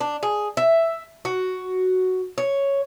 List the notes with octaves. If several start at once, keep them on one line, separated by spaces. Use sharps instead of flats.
D4
G#4
E5
F#4
C#5